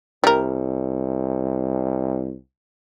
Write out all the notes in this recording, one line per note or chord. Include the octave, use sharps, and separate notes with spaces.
C2 G3 A#4